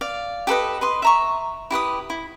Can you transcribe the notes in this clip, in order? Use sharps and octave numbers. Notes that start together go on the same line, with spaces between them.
D5 F5
G4 A4 B4 D#5
B4 D#5 C6
E5 A#5 C#6
E4 G4 B4 D#6
E4